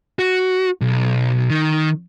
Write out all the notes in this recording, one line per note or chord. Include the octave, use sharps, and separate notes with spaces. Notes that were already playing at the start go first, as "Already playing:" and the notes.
F#4
B1
D#3